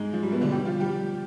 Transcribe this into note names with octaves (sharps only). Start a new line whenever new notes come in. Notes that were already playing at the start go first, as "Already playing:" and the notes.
Already playing: G#2 G#3
F3
G3
B2 B3
D3 D4
G3 G4
F3 F4
G3 G4